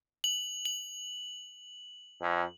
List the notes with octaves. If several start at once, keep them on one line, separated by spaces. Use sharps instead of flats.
F#7
F#7
F2